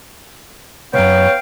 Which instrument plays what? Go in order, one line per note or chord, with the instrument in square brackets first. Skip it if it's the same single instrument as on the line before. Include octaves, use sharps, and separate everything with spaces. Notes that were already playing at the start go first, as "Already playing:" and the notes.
[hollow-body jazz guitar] C2 F#2 [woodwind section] B3 F5 G5 [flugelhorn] C#5